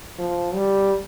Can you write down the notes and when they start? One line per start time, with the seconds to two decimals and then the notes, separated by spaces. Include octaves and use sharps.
0.19 F3
0.54 G3